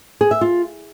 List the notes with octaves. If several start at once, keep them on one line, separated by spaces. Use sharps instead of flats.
G#4
E5
F4